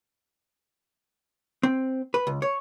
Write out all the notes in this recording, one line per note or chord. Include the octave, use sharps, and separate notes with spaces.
C4
B4
C#2
C#5